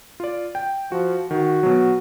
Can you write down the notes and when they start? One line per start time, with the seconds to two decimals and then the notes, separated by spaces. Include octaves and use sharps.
0.20 F4 D5
0.55 G5
0.92 F3 F#4
1.31 D#3 F#4
1.63 B2 F#3